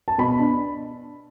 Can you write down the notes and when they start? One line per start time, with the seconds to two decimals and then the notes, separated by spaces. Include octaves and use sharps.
0.08 A5
0.18 B2 B5
0.39 D4